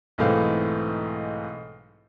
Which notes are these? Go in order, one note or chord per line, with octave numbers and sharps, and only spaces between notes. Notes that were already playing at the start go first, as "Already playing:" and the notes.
B1 G#2 E3 A3 C4 F5